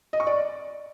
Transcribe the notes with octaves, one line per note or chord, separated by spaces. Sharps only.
D#5
C#6
D5